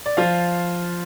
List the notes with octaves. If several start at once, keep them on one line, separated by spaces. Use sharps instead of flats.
D5
F3 F4 F5